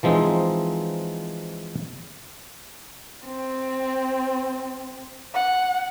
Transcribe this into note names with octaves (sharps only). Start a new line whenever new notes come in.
E3 F3 G#3 C4 D#4
C4
F#5